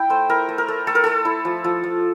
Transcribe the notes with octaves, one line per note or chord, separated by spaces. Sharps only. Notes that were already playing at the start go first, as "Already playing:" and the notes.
Already playing: E4 G5
A3 C5
E4 A#4
A3
A#4
A3
A3 A4
A#4
A3 A4
E4
F3
F3
F3